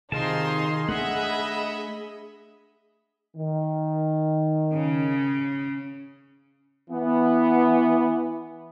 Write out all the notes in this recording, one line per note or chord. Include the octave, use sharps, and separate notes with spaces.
C3 D#3 D#4 F4 G#4 A5 C6
A3 D4 D#5 E5 F#5 B5
D#3
C#3
E3 B3